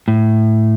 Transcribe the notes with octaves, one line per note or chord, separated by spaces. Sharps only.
A2